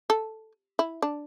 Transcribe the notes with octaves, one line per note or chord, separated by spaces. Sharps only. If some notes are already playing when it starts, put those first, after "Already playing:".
A4
E4
D4